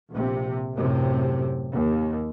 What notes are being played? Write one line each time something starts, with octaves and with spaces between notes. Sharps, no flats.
A#1 C3
F#2 A2 C3
D#2